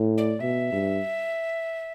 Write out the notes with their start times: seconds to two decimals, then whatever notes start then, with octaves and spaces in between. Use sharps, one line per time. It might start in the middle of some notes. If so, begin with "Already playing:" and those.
Already playing: A2
0.18 D5
0.40 B2 E5
0.73 G2